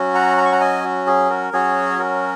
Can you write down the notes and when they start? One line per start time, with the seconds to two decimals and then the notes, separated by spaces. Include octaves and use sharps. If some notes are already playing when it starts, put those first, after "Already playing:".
Already playing: F#3 C#4 F#4
0.15 F#5 A#5
0.38 A#5
0.45 C#6
0.52 F#5 A#5
0.61 D#5 G#5
0.84 F#4
1.07 G#4
1.30 F#4 A#4
1.53 F#3 C#4 F#4 G#4 C#5
1.99 F#4 A#4